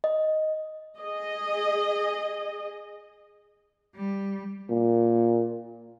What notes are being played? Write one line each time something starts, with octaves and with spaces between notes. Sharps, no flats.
D#5
G#4 D#5
G3
A#2